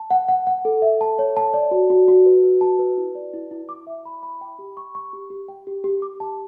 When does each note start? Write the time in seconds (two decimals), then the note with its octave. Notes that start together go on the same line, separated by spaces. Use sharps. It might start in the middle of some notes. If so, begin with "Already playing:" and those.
Already playing: A5
0.11 F#5
0.28 F#5
0.47 F#5
0.65 A4
0.82 E5
1.01 A5
1.19 C#5
1.37 A5
1.54 D5
1.71 F#4
1.90 F#4
2.08 F#4
2.26 B4
2.43 B4
2.61 A5
2.79 B4
2.97 E4
3.15 D5
3.33 E4
3.51 E4
3.69 D6
3.87 E5
4.05 B5
4.23 B5
4.41 G5
4.59 G4
4.77 C#6
4.95 C#6
5.13 G4
5.30 G4
5.48 G5
5.67 G4
5.84 G4
6.02 D6
6.20 A5